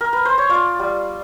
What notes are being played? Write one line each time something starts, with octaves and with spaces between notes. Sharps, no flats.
A#4
B4
C5
C#5
F4 D5
G3